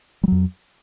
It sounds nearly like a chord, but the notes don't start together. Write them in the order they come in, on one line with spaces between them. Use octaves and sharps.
G3 F#3 F2